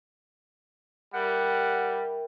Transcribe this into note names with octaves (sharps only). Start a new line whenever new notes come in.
G3 A#4 E5 F#5 G5